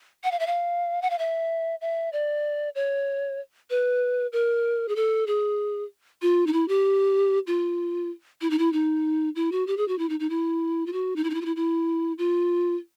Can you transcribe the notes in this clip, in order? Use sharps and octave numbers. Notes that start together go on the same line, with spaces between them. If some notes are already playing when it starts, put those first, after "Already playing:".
F#5
F5
E5
F5
F#5
F5
E5
E5
D5
C#5
B4
A#4
G#4
A4
G#4
F4
D#4
E4
G4
F4
E4
D#4
E4
D#4
E4
F#4
G4
G#4
F#4
E4
D#4
D#4
E4
F4
F#4
D#4
E4
D#4
E4
F4
E4
E4
F4